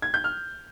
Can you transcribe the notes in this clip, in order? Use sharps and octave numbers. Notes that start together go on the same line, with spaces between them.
G#6
G6
F6